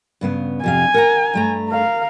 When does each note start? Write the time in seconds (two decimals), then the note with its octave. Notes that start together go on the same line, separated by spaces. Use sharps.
0.21 G2 C#3 B3
0.64 F2 C3 F5 G#5
0.94 A#4 F#5 A#5
1.34 G2 A3 A#5
1.69 A#4 F5